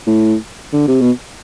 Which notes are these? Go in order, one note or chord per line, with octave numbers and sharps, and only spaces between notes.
A2
D3
C3
B2